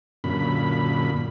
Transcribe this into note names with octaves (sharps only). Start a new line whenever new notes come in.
F#2 A#2 D3 B5